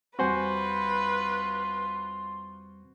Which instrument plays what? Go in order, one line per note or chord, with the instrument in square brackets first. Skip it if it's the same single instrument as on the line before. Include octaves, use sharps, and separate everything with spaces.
[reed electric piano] E2 G3 C4 [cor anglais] F4 [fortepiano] F#4 C5 G#5 [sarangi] B4